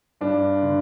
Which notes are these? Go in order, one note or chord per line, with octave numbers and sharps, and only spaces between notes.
G2 D4
D3